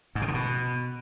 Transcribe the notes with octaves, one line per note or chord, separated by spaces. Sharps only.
G#2
B2
D3
B2